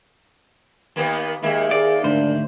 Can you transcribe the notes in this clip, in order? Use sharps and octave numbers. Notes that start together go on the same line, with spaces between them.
D#2 A#3 B3
D#2 G#3 A#3 E5
G#4 D5
D2 G#2 D4 C5